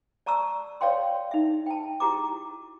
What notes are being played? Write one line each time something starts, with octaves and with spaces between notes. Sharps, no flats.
D5 A5 A#5 C#6 E6
C#5 D5 F5 G5 C6
D#4 E5
G5 A5
E4 F#4 G4 A#5 D6